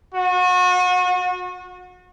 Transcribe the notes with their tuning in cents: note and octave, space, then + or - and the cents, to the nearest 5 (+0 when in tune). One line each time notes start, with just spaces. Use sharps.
F#4 -35